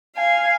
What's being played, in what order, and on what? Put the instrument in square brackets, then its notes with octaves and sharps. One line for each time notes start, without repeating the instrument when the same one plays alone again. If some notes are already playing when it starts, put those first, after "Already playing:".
[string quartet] F5 G#5